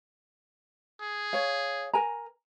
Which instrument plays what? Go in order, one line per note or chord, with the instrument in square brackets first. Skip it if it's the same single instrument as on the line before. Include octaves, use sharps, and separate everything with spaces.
[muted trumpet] G#4
[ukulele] C#5 F5
A#4 G#5 A#5